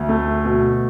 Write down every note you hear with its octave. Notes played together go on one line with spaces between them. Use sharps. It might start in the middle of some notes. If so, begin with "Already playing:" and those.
Already playing: D2
A3
B2